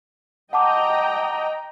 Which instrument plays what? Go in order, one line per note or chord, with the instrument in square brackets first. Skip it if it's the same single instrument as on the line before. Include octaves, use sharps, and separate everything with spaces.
[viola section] D#5 G5 A#5 [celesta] F#5 A5 D6